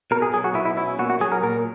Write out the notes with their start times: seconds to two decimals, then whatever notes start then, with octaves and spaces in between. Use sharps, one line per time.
0.11 B2 A#4
0.22 G#4
0.34 F#3 G#4
0.44 F#4
0.54 B2 E4
0.65 E4
0.77 C#4 E4
0.99 A#2 F#4
1.10 F#4
1.20 F#3 G#4
1.32 A#4
1.43 A#2 A#4